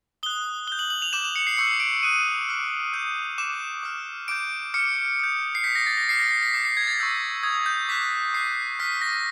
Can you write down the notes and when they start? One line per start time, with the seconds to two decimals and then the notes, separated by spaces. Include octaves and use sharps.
0.23 D#6 F#6 G7
0.67 D#6 G6 G7
0.79 F#7
0.90 F#7
1.02 F7
1.13 D6 G6 E7
1.25 E7
1.36 C#7
1.47 C7
1.57 C#6 E6 G6 C#7
1.80 D7
2.03 D#6 F#6 D#7
2.49 D6 F6
2.93 D#6 G6
3.38 D6 F#6 E7
3.83 D6 F6
4.28 D6 G6 D7
4.74 D6 F6 C#7
5.19 D#6 G6
5.55 C7
5.64 D#6 G6 B6
5.75 A#6
5.87 A6
5.97 A#6
6.09 D6 F6 C7
6.20 A#6
6.31 A#6
6.43 B6
6.53 D6 G6 C7
6.65 C7
6.77 G#6
6.87 A6
6.99 C#6 E6 G6
7.43 D#6 G6 G#6
7.66 G6
7.89 D6 F#6 B6
8.34 C#6 F#6 C7
8.79 C#6 F6 B6
9.01 A#6